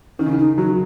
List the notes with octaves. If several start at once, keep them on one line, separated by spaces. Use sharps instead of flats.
D#3 C#4
C#3
D#3
D#4
F#3 F#4